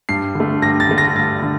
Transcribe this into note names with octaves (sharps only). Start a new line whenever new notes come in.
G2 C7
D3 A3
G2 A#6
A6
D3 A3
A#6
G2 A6
D3